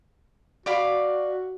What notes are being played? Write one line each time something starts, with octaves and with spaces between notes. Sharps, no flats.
F#4 D5 F5 B5